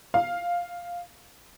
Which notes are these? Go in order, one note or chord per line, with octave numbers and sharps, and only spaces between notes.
F5